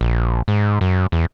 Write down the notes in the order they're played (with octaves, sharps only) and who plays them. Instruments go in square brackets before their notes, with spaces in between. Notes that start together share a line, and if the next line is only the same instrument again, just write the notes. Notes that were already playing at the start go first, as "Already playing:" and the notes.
[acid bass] A#1
G#2
F#2
E2